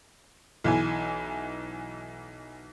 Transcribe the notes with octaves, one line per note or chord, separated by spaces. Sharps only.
B1 E3 G#5